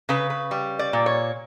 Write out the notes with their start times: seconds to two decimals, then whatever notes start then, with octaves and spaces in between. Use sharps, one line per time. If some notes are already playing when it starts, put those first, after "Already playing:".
0.09 C#3 B4
0.30 B4
0.51 G3
0.79 D5
0.93 A#2
1.06 C#5